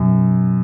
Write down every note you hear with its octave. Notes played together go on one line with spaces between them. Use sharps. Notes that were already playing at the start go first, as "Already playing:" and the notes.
Already playing: F#2 B2